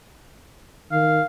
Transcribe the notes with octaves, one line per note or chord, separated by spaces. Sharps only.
D#3 F5